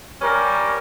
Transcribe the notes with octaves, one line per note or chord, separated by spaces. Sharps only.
G3 C#4 A#4